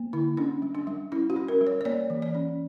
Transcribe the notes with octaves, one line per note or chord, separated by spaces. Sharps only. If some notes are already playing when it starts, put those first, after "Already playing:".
Already playing: A#3
D3 E4
C#4 D4
G3
D4
G3
C#4 E4
F#4
C#4
A#4
G3
C#5
C#5
A#3 D5
E3
D5
C#4